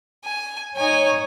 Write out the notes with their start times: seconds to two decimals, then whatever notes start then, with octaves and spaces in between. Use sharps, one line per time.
0.24 G#5
0.76 D#4 C#5 G#5